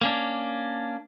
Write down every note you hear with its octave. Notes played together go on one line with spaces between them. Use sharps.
A#3 C#4 D4